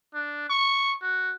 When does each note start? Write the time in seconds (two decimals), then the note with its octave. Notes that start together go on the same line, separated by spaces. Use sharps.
0.14 D4
0.49 C#6
1.02 F#4